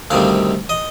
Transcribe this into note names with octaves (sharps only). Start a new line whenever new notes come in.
D2 C3 D#3 G3 F5
D#5